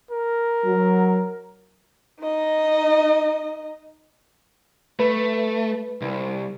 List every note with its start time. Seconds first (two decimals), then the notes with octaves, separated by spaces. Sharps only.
0.11 A#4
0.65 F#3
2.21 D#4 D#5
5.00 A3 B4
6.01 C2